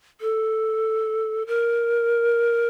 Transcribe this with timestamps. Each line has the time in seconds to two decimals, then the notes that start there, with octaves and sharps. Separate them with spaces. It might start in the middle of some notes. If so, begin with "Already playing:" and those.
0.21 A4
1.47 A#4